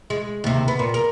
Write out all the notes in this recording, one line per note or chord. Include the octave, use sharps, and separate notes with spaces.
G#3
D#2 C3
B3
A#2
A#4